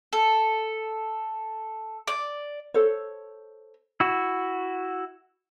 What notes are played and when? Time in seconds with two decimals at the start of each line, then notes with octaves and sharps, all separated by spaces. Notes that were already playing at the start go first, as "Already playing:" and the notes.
0.13 A4
2.08 D5
2.74 A4 C5 C#5
4.00 E4 F#4